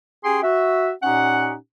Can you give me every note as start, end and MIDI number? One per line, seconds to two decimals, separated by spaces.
0.24 0.43 61
0.24 0.43 67
0.24 0.43 68
0.24 0.43 79
0.24 0.43 84
0.43 0.90 66
0.43 0.90 76
1.03 1.54 46
1.03 1.54 61
1.03 1.54 63
1.03 1.54 67
1.03 1.54 78